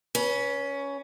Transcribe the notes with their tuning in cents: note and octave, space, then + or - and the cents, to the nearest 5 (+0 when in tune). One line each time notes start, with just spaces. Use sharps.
C#4 +15 B4 -20